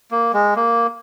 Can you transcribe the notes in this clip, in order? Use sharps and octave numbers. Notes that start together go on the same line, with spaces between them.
A#3
G#3
A#3